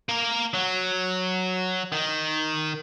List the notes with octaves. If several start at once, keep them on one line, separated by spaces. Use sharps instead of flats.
A#3 A#4
F#3
D#3